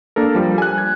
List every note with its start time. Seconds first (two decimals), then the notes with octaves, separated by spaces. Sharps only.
0.16 A#3 D4 A4 A#4
0.35 F3 G3
0.58 G#5 F#6
0.78 G#6